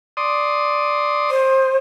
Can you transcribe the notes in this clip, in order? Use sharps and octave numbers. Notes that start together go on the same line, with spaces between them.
D5 C6 D#6
C5